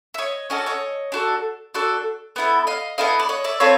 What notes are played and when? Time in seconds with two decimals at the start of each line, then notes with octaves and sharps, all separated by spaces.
0.14 E5
0.18 C#5 D#5
0.50 C#4 F#4 A4 D#5
0.58 D5
0.66 C#5 D#5
1.12 D4 F#4 A4
1.74 D4 F#4 A4
2.36 B3 E4 A4
2.67 D#5 F5
2.98 B3 E4 A4 D#5 F5
3.20 D5
3.29 C#5 D#5
3.44 D5 E5
3.60 C4 F4 A4 B4 C#5